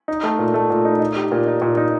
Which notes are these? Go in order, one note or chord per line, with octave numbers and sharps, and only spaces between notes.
D#4
A3
A#2
A3
A#2
D#4
D#4
G4
A#2
D#4
A#2
D#4